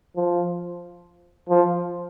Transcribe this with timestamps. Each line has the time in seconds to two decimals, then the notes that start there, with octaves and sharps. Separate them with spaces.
0.16 F3
1.49 F3